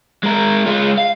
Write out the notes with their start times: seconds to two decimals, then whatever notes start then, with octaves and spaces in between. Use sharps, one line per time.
0.23 G#3 A#4
0.66 G#3 F4
0.98 F5